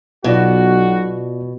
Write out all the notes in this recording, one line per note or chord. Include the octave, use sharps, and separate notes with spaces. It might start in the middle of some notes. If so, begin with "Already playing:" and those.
B1 B2 B3 F4 F#4 D5